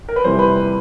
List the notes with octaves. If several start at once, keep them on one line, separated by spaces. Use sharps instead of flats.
A#4
B4
F2 C3 E3 G3 C5
B4